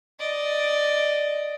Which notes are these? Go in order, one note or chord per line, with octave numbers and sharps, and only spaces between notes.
D5 D#5